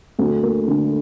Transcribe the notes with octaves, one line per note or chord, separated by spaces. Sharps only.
D2
A#3
D3